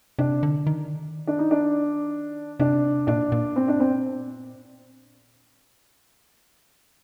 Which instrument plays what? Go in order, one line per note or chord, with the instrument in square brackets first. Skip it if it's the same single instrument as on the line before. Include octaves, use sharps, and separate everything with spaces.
[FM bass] C3 [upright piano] D4
[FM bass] D3
D#3
[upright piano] D4
D#4
D4
[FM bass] C3 [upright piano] D4
[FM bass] A#2 [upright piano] D4
[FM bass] A#2
[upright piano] C4
D4
C4